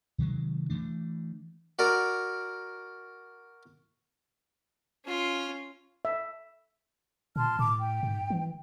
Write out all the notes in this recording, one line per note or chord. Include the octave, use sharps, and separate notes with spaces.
C3 D#3 F#3 G#3
E3 F#3 A3 D4
F#4 A#4 D5
C#4 F4
E5
A#2 A5 C6 F6
A2 D6
G5
G#2
E3